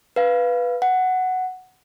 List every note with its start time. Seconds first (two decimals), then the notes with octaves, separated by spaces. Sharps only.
0.16 B4 F5
0.82 F#5